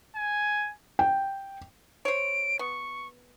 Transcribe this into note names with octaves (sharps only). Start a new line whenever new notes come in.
G#5
G5
C5 C#5 D7
B3 C#6